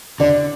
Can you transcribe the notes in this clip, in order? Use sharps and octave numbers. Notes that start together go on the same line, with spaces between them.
D3 D5